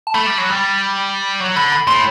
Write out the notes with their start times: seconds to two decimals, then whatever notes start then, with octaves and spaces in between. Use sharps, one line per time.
0.07 A5
0.14 A3 B5
0.26 G3
0.38 F#3
0.50 G3
1.40 F#3
1.56 D3 B5
1.72 B5
1.87 A2 C6